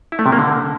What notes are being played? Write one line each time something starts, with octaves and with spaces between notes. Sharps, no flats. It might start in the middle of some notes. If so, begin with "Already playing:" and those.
E4
A3
C3
A#3
D3